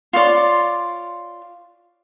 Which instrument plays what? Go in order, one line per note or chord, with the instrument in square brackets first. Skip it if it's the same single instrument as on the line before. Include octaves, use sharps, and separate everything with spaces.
[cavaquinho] F4 C#5 D5 C6